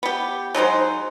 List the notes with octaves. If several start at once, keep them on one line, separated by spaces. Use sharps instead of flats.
B3 G4
F#3 G#3 D#4 C5